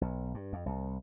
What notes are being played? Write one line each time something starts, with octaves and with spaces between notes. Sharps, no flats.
B1
G2
F2
C2